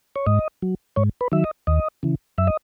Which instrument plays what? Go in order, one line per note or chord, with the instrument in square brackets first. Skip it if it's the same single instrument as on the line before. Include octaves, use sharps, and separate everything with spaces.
[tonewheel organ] C#5
G#2 D#5
F#3
G#2 C#5
B4
D#3 F#3 E5
D#5
D#2 D#5
C#3 E3
F#2 E5
D#5